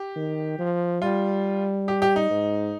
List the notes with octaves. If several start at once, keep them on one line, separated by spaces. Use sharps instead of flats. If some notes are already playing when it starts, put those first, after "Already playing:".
Already playing: G4
D#3
F3
G3 F4
G4
G4
D#4
G#2